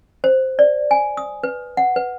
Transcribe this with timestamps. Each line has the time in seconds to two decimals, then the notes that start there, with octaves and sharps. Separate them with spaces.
0.24 C5
0.59 D5
0.91 G#5
1.17 D#6
1.43 B4
1.77 F#5
1.96 B4